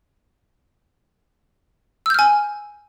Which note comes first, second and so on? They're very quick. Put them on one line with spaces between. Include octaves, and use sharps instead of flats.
E6 G6 F6 G#5